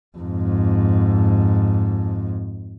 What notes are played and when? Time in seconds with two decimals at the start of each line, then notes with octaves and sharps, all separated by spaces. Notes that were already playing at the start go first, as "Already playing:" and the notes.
0.18 F2 G#2